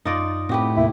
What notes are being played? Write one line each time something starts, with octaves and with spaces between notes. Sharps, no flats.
F#2 D#4 F4 D5
A2 C4 F#4 G4 B4
D#2 C3 A#3 E4